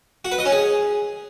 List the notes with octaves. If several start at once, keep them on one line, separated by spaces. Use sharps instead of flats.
F#4
B4
D#5
C#4
G#4